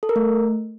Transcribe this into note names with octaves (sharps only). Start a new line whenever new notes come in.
A4
A#4
A3